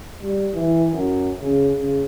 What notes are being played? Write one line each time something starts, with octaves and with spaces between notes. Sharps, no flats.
G3
E3
F#2
C#3
C#3